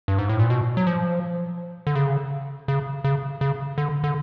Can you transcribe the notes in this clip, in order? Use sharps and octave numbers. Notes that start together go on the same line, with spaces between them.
G2
G#2
A2
A#2
B2
F#3
F3
D3
C#3
C#3
C#3
C#3
D3
D3